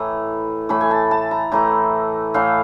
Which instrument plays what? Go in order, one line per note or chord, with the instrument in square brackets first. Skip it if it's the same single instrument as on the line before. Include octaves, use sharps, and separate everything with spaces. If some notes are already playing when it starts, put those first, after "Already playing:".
Already playing: [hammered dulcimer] A2 E3 A3 A#5
A2 E3 A3 B5
G#5
A5
A5
A#5
A2 E3 A3 A#5
A2 E3 A3 F5